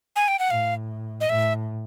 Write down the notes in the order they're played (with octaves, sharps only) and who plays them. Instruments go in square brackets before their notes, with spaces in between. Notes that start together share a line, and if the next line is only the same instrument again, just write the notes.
[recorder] G#5
G5
F#5
[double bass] A2 [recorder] F5
[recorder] D#5
[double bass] A2 [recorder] E5